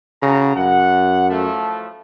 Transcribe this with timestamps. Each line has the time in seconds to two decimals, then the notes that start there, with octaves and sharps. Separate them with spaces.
0.23 A2 C#3 F#4 A#5
0.56 F#2 F#5
1.30 A2 F3 A3